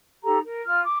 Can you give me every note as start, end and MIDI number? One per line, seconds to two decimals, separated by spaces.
0.24 0.38 63
0.24 0.38 67
0.24 0.38 69
0.24 0.38 82
0.44 0.62 70
0.64 0.82 65
0.64 0.82 89
0.83 0.97 86